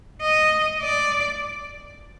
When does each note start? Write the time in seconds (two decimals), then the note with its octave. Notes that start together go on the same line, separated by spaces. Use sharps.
0.22 D#5
0.82 D5